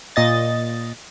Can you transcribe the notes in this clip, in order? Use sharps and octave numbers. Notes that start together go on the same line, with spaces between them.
A#2 D#5 A6